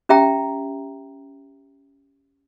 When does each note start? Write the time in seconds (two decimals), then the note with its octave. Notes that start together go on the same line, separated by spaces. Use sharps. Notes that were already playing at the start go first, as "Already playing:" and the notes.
0.09 C#4 G4 E5 G5 A#5